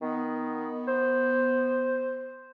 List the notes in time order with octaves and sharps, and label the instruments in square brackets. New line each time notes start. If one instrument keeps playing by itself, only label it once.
[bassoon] D#3 [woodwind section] B3
[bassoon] C5